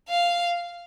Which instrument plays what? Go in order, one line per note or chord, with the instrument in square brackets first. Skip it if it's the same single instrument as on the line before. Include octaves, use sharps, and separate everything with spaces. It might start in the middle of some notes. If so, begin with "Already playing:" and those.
[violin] F5